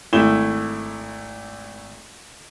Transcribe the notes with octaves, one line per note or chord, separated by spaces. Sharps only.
G#1 A3 E4 E7 G7